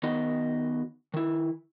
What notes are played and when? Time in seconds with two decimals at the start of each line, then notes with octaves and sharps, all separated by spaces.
0.03 D#3 B3 D#4 F#4 D#5
1.14 D#3 E4